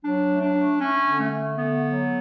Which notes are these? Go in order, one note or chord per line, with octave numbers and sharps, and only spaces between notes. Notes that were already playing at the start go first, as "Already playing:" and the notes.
F#3 D4
A3
D4
A3
A3 C#4
D3
A3
A3
D3 B3
F#3